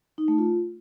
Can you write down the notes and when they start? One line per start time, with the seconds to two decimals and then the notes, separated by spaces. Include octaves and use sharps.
0.18 D#4
0.28 A3
0.38 F4